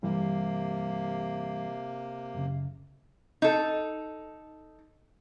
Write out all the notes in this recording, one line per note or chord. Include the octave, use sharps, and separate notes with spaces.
G2 C3 E3 G3 A#3
F#2 C#3
D#4 A4